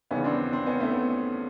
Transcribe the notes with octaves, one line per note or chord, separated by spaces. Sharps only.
D#2 C#3 E3 B3 C#4
C4 D4
C4 D4
B3 C#4
A3 B3